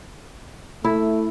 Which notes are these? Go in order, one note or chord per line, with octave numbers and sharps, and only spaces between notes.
A3 E4